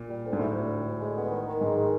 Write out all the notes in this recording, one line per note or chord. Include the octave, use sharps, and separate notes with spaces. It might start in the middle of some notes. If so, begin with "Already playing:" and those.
Already playing: A#2
G3
D2
G#2
A2 G3
D2
D3
D2
G#3
B3
D#3
D#3
G#2 G#3
D#3